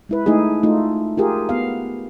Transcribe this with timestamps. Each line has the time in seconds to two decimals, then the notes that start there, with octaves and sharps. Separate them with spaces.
0.09 G#3 E4 B4
0.26 A3 D#4 E4 G#4
0.63 A3 D#4 F4
1.17 F4 G4 G#4 A#4
1.49 B3 F5